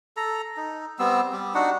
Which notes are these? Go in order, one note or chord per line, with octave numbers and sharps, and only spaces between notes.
A4 A#5
D#4
G3 B3 C4 E6
G3 G4
D4 D#4 F#4 F#5